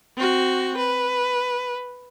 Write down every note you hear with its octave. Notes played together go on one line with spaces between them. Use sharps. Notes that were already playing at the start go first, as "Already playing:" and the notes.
C4 F#4
B4